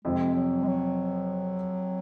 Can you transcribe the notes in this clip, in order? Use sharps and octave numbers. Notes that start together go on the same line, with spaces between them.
F2 C3 F3 G#3
F#3
G#3
F#3